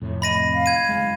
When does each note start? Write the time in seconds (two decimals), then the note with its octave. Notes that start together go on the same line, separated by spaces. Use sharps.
0.02 F2 A2 C3
0.22 D#5 B5 A#6 D#7
0.53 F5
0.66 G#6 D#7
0.89 F#1 G#3